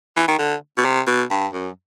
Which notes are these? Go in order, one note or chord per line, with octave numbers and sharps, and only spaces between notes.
E3
D#3
D3
B2
C3
B2
G2
F#2